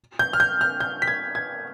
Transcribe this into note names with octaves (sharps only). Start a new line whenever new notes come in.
G6
F6
G6
F6
G6
B6
G#6
G#6